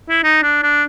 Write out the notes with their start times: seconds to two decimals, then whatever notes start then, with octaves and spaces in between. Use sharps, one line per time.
0.09 E4
0.24 D#4
0.43 D4
0.63 D4